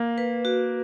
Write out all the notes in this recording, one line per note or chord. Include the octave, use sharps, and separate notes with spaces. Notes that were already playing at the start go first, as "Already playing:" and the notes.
Already playing: A#3
B4
F#4